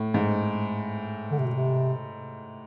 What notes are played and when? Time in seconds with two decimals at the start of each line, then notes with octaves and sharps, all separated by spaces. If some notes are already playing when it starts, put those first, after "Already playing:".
Already playing: A2
0.14 G#2
1.31 D3
1.39 C3
1.46 B2
1.55 C3